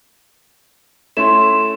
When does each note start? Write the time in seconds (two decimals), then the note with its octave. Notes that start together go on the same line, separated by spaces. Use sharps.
1.17 A3 C#4 E4 C6 E7